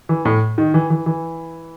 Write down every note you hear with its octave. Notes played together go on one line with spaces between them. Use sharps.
E3
A2
D#3
E3
E3
E3